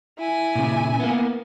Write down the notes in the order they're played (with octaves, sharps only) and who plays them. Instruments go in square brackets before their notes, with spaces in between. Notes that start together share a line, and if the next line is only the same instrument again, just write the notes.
[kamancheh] E4 G#5
[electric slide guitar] A#2 C#3
A#3 B3